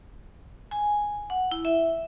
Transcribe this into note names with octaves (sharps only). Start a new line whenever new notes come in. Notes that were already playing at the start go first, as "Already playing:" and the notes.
G#5
F#5
E4
E5